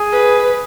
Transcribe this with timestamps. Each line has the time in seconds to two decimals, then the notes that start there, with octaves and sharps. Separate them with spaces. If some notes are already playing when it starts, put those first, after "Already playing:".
Already playing: G#4
0.13 B4